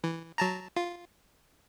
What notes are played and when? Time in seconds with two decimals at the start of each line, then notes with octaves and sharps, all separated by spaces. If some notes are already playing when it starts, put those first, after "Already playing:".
0.04 E3
0.38 F#3 A5 A#5
0.76 F4